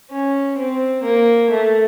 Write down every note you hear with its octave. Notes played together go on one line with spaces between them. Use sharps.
C#4
C4
A#3
A3